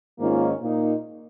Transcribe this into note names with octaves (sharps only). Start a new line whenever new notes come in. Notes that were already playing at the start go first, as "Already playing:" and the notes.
G#2 D#3 A#3 C#4 F4
A#2 A#3 D#4